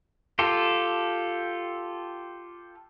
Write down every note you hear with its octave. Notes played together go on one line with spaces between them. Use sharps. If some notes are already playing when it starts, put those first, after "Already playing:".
F4 G4 A4